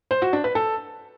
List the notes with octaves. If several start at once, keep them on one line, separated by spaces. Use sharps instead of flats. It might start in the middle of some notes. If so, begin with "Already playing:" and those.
C5
F#4
D4
B4
A4